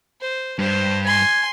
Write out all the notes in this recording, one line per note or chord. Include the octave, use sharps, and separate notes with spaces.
C5
G2 C5
G#5 C6 G#6